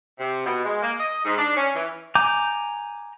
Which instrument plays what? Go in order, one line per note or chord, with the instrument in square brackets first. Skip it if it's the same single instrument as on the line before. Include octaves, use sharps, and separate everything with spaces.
[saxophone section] C3
B2
G#3
A#3
D#5
G#2
D4
C#4
E3
[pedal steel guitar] G#5 A#5 D6 G6